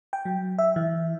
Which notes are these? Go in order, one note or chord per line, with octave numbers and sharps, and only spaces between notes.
G5
F#3
E5
E3